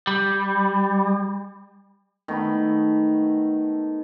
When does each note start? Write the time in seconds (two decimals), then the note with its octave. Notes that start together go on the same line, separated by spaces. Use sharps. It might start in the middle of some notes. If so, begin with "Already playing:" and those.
0.07 G3
2.28 D#3 A3 B3 B5